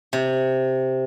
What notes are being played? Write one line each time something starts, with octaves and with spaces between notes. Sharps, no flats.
C3